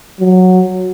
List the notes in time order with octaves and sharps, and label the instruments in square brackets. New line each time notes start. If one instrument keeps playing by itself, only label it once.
[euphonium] F#3